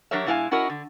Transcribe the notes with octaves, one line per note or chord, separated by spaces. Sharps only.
F#3 D4 G4 A#4 C#5 E5
B2 G#3 E4 G#4 F5 G#5
C#4 E4 F#4 A#4 D#5
D3